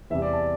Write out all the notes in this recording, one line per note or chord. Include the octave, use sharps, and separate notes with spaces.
E2 C3 G3 E5
D5
A5